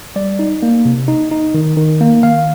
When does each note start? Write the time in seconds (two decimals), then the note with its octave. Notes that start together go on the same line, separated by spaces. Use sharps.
0.16 G3 D5
0.39 D#4
0.63 A#3
0.85 C3
1.08 D#4
1.32 D#4
1.54 D#3
1.77 D#3
2.01 A#3
2.23 D#3 F5